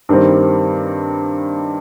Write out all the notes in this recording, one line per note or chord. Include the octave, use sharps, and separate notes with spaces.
G2 D#3 G3 C4